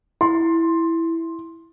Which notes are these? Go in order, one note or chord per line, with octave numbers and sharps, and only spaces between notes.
E4 C6